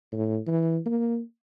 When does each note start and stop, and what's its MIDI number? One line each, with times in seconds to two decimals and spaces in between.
0.12 0.38 45
0.48 0.79 52
0.86 1.20 58